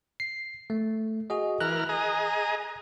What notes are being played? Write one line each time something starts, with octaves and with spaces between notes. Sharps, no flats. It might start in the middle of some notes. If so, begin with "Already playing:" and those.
C7
A3
F#4 G#4 D#5
E3 A#4 F6 F#6
G#4 D#5 A#5